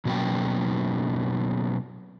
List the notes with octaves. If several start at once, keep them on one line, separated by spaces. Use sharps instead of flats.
B2 F#3 A#3 C#4 G5